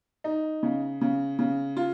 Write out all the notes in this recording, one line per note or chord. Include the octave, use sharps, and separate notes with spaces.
D#4
C#3
C#3
C#3
F4